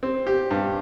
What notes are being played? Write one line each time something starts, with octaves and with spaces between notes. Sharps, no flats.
C4
G4
G2